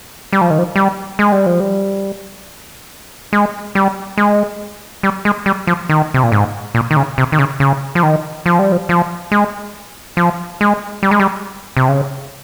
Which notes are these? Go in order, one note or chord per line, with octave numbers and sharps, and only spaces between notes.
G3
F3
D#3
F3
G3
G#3
G3
F3
G3
G#3
G3
G#3
G3
G#3
G3
F3
D#3
C3
A#2
G#2
A#2
D#3
C#3
C3
D#3
C#3
C#3
F3
D#3
F3
G3
F3
F3
G#3
F3
G#3
G3
G#3
G3
C3
C#3